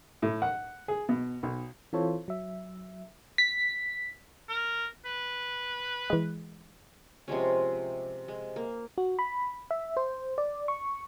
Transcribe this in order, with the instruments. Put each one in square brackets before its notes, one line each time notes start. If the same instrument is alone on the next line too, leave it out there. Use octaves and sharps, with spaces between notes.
[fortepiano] A2
F#5
G#4
B2
B1
[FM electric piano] E3 C4 F4 A4 C5 C#5
F#3 E5
B6
[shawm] A#4
B4
[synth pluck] E3 G#3
[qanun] C3 F3 G#3 C#4
G#3
A#3
[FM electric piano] F#4
B5
E5
C5
D5
C#6